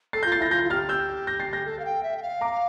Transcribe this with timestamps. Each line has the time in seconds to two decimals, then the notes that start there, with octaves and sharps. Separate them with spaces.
0.13 A4 A6 C7
0.23 G6 A#6
0.26 F4
0.32 A6 C7
0.38 E4 G6 A#6
0.51 F4 G6 A#6
0.64 F4
0.70 G4 F6 A6
0.89 E6 G6
1.27 G6 A#6
1.40 A6 C7
1.53 G6 A#6
1.66 A4
1.79 F5
1.85 G5
2.03 E5
2.17 G5
2.22 F5
2.41 A#5 D6